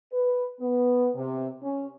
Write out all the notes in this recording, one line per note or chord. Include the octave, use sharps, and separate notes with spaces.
B4
B3
C3
C#4